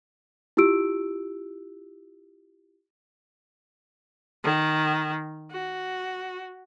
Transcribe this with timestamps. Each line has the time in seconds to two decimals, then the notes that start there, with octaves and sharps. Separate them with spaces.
0.57 E4 F4 G4 E6 D7
4.44 D#3
5.51 F#4